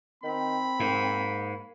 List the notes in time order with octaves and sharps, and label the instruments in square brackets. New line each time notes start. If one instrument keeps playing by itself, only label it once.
[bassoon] D#3 [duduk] C4 [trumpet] B5
[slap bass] G#2 [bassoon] A#3